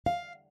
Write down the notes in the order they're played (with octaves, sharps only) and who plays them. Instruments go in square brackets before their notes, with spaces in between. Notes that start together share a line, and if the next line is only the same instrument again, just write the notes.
[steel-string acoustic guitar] F5